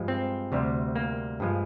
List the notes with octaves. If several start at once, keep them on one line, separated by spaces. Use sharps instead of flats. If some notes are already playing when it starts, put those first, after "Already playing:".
Already playing: G2 F3 G#3
C4
D2 C3 G3
A#3
G2 F3 G#3